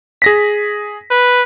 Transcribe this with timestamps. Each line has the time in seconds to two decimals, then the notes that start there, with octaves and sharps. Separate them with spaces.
0.22 G#4 A#6 B6
1.11 B4